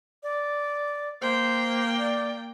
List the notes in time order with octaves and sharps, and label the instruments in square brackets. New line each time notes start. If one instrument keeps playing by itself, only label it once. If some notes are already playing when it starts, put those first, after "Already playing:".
[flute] D5
[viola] A#3 G5 [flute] C5
[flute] D5